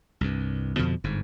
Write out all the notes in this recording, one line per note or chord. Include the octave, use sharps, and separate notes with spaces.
C2 G2
F2 B2 D3 F3
G1 G#2